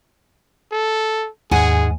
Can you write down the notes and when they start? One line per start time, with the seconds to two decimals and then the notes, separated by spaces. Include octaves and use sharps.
0.72 A4
1.51 D#2 G#2 G#4 F#5 G#5